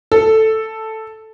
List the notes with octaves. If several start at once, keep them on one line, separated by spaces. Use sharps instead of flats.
A4